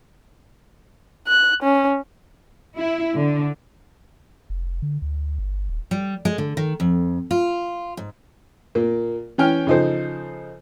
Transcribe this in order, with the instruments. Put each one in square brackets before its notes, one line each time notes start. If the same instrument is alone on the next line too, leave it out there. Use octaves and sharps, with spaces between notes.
[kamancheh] F#6
C#4
[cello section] E4
D3
[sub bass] F1
D3
D2
G1
D#1
[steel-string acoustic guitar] G3
G#3
D3
D#3
F2
F4
G#2
[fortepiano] A#2 A#3
E3 C#4 G5 F6
C#3 F3 D#4 A4 C5